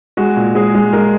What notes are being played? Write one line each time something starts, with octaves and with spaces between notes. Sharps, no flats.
G#3 F#4
A#2
G#3 G#4
G#3
G#3 A#4